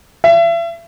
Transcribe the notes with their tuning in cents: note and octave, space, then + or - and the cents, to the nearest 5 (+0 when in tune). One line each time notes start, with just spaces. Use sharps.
E5 +40